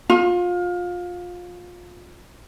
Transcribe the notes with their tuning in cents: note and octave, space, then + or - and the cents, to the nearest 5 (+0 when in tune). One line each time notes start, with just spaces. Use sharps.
F4 +25